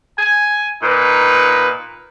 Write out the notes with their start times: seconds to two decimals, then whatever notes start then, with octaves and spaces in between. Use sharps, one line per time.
0.18 G#5
0.81 A#2 D#4 B4